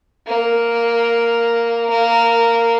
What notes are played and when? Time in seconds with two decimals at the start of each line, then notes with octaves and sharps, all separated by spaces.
0.27 A#3
1.90 A#3